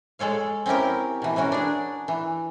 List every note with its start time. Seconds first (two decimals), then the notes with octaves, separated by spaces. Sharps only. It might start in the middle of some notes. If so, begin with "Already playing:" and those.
0.19 G#3 A4 C#5 F5
0.66 C4 C#4 E4 G4 A#4
1.22 B2 E3
1.36 E3 C#4 F#4 A#4
1.52 D4 G#4
2.08 E3